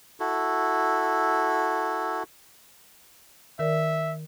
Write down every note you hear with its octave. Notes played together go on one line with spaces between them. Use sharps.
E4 F#4 A4
D#3 A#4 D5 E5